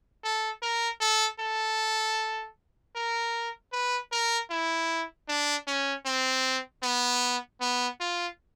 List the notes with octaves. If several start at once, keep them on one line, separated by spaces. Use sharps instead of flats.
A4
A#4
A4
A4
A#4
B4
A#4
E4
D4
C#4
C4
B3
B3
F4